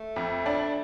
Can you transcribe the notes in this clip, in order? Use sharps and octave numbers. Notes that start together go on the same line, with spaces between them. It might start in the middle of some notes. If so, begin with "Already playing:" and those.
Already playing: A3
F2
D4